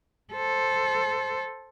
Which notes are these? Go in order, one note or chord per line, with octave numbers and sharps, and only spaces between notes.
A4 C5